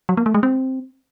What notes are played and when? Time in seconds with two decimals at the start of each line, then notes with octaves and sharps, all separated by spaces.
0.09 F#3
0.17 A#3
0.26 A3
0.34 G#3
0.43 C4